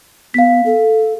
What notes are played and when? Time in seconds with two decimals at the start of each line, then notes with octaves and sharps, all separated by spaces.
0.34 B3 F5 B6
0.66 A4